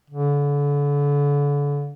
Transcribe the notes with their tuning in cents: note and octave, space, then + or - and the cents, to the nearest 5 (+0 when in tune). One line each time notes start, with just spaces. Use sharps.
D3 -35